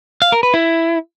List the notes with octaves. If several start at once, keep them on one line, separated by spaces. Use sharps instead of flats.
F5
A#4
B4
E4